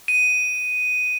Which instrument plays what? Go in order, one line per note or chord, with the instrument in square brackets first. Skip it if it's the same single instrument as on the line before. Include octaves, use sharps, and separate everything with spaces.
[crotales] D#7